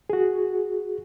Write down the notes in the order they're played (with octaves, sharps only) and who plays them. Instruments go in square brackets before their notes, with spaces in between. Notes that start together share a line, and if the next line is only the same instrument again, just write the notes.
[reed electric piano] F#4 G#4